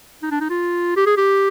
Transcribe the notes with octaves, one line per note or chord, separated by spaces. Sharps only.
D#4
D4
D#4
F4
G4
G#4
G4